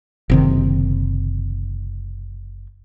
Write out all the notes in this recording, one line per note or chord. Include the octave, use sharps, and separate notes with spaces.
F#1 C3 D#3